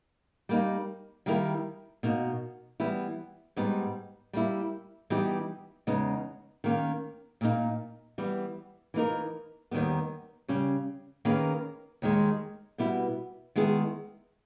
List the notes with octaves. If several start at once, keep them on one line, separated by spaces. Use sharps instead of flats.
G3 A#3 D#4
D#3 G3 A#3 E4 A#4
B2 A#3 D#4
E3 G3 B3 E4
G#2 G3 B3 D#4
G3 A#3 E4
E3 G3 B3 D#4 G4
E2 C#3 G#3 B3 D#4
D#3 A#3 C#4
A#2 A#3 D#4
E3 G3 B3
E3 A#3 D#4 A#4
D#2 D#3 G3 B3
C#3 G3 C#4
D#3 A#3 C#4 G#4 B4
D#2 D#3 G#3
B2 G3 B3 E4
D#3 G#3 B3 E4 G#4